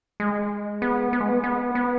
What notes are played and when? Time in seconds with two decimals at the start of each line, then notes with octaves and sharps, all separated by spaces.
0.20 G#3
0.82 B3
1.13 B3
1.21 G#3
1.28 B3
1.44 B3
1.75 B3